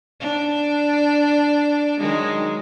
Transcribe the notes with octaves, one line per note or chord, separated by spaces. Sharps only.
D4
D#3 F#3 G#3